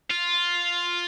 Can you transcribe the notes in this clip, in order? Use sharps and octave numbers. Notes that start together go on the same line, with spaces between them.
F4